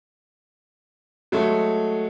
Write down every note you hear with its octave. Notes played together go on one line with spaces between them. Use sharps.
F#3 G#3 A3